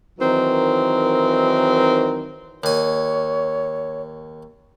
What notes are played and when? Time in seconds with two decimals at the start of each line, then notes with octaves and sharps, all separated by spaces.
0.19 D#3 E3 F#3 C4 D#4 A#4
2.64 D#2 C#5 G#5